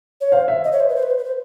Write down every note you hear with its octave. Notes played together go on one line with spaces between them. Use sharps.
C#5
C5 F5
E5
D#5
C#5
C5
B4
C5
B4
C5
B4
C5